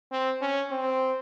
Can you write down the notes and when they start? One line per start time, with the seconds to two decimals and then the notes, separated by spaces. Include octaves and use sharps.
0.12 C4
0.41 C#4
0.71 C4